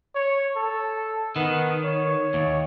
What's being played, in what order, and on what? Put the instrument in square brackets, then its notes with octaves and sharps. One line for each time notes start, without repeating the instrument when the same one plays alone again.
[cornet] C#5
A4
[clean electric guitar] D#3 [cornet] B3
[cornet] C#5
[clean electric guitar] D#2